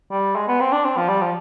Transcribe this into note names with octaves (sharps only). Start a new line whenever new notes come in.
G3
G#3
B3
C4
D4
C4
F3
G3
F3